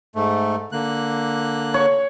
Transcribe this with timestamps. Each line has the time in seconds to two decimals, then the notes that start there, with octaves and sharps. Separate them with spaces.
0.16 G#2 A3
0.72 D3 A#3 F#6
1.74 C#5